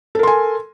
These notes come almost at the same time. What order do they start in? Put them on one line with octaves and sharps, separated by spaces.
A4 A#4 C6 G#5